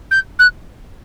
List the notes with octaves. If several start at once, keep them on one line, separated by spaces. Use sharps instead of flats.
G6
F#6